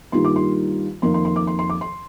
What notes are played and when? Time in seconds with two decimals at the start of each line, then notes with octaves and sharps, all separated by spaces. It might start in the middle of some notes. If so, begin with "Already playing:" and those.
0.12 G2 D#3 G3 A#3 F4 C6
0.25 D6
0.36 C6
1.02 F2 D#3 A#3 D#4 C6
1.14 C6
1.25 C6
1.36 D6
1.47 C6
1.59 C6
1.70 D6
1.81 C6